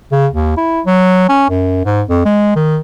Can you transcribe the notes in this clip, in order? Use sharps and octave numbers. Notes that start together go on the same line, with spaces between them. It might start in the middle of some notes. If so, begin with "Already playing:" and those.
C#3
D#2
E4
F#3
C#4
F#2
G#2
F2
G#3
D#3